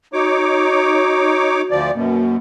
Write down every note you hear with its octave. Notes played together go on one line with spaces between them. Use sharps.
D#4 F#4 C#5 D6
D2 F3 D5
F#2 B2 A#3